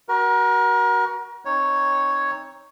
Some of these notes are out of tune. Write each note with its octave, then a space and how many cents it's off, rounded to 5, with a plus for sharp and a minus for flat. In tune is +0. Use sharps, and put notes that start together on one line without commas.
F#4 +20 A#4 +35
C4 +25 D#4 +0 C#5 +0